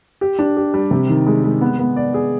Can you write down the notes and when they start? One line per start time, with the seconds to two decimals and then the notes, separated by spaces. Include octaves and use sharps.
0.21 G4
0.39 D4
0.57 G4
0.74 G3
0.91 C3
1.09 D#3
1.27 G#3
1.44 G#3
1.61 B3
1.79 B3
1.96 D5
2.14 G#4